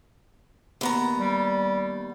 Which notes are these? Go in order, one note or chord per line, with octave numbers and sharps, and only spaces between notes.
D#2 B3 A#5
G3